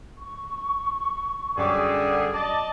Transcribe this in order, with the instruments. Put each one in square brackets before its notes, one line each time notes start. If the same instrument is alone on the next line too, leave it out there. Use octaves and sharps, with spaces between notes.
[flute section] C#6
[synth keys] F#2 D6 [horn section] D3 G3 G#4
[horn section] D5 D#5 A5